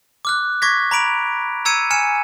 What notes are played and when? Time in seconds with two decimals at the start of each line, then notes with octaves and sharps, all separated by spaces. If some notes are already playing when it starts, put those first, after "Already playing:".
0.25 D6 F6 F#6
0.62 C#6 D6 G#6 A#6 B6
0.91 A#5 B5 D7 F7
1.65 A#5 E6 G#6 C#7 D#7
1.90 G#5 F6 G#6 C#7 E7